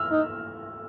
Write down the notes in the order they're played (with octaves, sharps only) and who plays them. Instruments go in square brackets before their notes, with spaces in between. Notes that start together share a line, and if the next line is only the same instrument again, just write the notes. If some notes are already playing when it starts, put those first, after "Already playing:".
Already playing: [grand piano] E6 F6
[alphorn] D#4